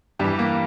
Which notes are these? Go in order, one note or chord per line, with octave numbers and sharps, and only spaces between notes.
G2 E3 G4
A#3